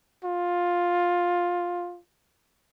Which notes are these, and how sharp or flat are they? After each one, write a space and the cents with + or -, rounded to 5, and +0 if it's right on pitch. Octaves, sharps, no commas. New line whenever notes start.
F4 +10